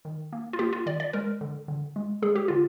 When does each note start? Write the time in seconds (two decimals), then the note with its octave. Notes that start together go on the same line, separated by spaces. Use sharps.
0.05 D#3
0.33 A#3
0.53 F4
0.59 A#3 G4
0.73 F4
0.86 D#3 D5
1.00 D5
1.13 G#3 A#4
1.41 D3
1.68 D3
1.96 G#3
2.22 G#3 G#4
2.36 G4
2.48 D3 F4